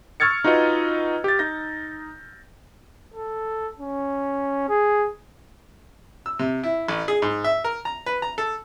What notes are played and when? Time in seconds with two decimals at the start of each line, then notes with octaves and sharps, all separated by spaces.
0.20 C#6 E6 F6 G#6 A6 C#7
0.44 D#4 F4 F#4 B4 D#5
1.24 G4 A6
1.39 D#4 G6 A#6
3.14 A4
3.80 C#4
4.69 G#4
6.26 E6
6.39 C3
6.63 E4
6.88 A1
7.08 G#4
7.22 G#2
7.44 E5
7.64 A#4
7.85 A#5
8.06 B4
8.22 A#5
8.38 A4